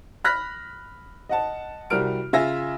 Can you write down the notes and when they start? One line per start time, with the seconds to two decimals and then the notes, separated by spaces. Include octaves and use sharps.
0.24 B5 F6 F#6 A#6 B6
1.29 D#5 F#5 A5
1.90 C2 G3 F#4 A#4 F6 D7
2.33 C#3 F4 E5 G#5 A#6